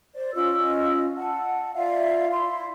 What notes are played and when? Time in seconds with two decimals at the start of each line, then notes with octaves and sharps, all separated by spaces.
0.15 C5 D5
0.34 C#4 F4 D#5 E6
1.17 F#5 A5
1.74 F4 D5 E5 F5
2.32 E4 C6